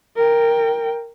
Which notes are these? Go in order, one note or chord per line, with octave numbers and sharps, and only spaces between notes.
A#4 G5